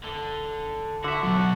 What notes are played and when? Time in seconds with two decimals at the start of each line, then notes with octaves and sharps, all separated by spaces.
0.04 D3
1.04 D3 F#4 E5
1.23 B2 F#3 D4 F#4